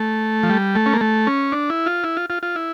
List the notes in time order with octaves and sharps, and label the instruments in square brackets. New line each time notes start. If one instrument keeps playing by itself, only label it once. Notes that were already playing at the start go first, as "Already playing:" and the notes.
Already playing: [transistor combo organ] A3
F3
G3
A3
C#4
A#3
A3
C#4
D4
E4
F4
E4
F4
F4
F4
E4